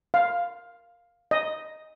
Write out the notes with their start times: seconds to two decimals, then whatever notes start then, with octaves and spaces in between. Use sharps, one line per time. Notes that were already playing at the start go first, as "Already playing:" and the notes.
0.14 F5
1.31 D#5